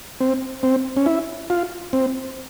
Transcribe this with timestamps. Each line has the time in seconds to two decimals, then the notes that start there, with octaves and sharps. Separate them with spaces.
0.21 C4
0.63 C4
0.97 C#4
1.06 E4
1.50 F4
1.93 C4